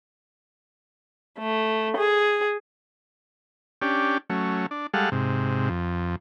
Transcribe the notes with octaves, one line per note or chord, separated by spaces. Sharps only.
A3
G#4
C#4 D4 G4
F#3 A3 C#4
D4
G3 G#3 A4 F5 F#5
G#2 C3
F2